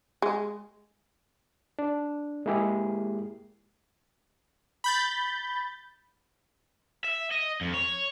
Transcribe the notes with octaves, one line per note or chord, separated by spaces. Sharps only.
G#3
D4
G#3 A#3 E4 G4 G#4
B5 G6 A6
E5
D#5
F2
C#5